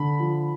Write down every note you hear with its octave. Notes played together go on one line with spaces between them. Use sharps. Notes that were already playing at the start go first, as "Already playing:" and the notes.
Already playing: D3 B5
F3